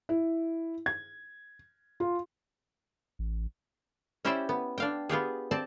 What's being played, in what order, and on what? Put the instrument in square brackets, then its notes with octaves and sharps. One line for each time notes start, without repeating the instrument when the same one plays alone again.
[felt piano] E4
G#6
F4
[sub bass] A1
[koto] C#4 E4 G4 C5 D5 E5
B3
D4 F5 G5
B3 F4 G4 G#4
C4 D5 A5